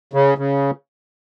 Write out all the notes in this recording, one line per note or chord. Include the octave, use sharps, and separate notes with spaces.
C#3
C#3